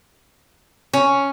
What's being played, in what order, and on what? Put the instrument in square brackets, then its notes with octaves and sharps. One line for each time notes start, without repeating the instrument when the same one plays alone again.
[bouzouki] C#4